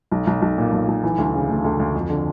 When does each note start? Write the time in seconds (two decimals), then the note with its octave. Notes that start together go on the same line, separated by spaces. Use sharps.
0.11 B1
0.27 B1
0.42 B1
0.58 A#2
0.72 B1
0.88 B1
1.04 E3
1.18 D2
1.34 C#3
1.49 A3
1.64 D2
1.80 D2
1.95 F2
2.10 D3